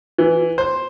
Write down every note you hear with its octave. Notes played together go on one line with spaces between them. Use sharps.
E3
C5